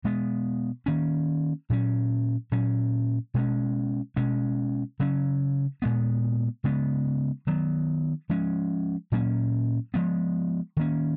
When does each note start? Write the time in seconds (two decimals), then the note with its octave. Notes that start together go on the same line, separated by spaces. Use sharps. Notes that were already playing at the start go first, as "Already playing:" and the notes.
0.04 B2 G#3 B3
0.86 D#3 A#3 C#4
1.70 A#2 F#3 C#4
2.52 A#2 F#3 C#4
3.34 B2 G#3 C#4
4.16 B2 G#3 C#4
5.00 C#3 F#3 C#4
5.82 A#2 G#3 B3
6.64 C#3 G#3 B3
7.47 D#3 F#3 B3
8.29 F3 G#3 C#4
9.12 A#2 F#3 A#3 C#4
9.94 F3 G#3 B3
10.77 D#3 A#3 C#4